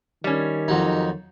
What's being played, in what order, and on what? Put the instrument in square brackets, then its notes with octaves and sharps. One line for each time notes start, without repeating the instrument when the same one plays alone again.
[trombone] D#3 [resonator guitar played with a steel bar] G3 C#4
[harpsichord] F2 F#3 D#4